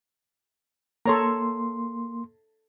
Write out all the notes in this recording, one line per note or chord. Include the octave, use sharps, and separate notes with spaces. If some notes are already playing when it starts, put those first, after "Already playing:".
A#3 A4 C#5 A#5 C6